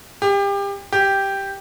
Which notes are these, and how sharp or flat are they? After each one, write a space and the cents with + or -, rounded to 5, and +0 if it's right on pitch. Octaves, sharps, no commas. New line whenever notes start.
G4 +30
G4 +0